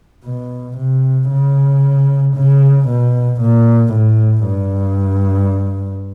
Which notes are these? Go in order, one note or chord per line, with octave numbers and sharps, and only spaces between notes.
B2
C3
C#3
C#3
B2
A#2
A2
G2